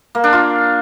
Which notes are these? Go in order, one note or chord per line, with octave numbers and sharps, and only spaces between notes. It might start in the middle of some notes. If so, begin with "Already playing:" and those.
A#3
D4
F4